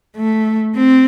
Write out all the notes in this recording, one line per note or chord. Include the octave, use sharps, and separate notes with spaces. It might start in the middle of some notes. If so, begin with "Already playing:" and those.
A3
C4